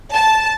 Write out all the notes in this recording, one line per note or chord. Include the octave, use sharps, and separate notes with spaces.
A5